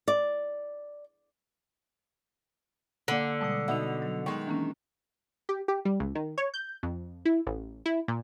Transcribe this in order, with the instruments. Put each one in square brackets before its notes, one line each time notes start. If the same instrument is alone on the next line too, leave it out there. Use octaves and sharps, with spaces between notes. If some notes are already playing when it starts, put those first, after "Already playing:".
[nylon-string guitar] D5
[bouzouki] D3 [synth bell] A#3 C#7 [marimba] D5 F#5
[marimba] B2 G3 G#3 [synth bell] A5 D#6
[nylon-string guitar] B2 [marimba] D#4 E5 [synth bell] F#5 E6 F7
[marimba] F#3
[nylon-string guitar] D#3 G#3 [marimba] G5 C#6
[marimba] E3 A#3 C#4 [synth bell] D4
[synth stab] G4
G4
G3
C#2
D#3
C#5
G6
F2
E4
A1
E4
A#2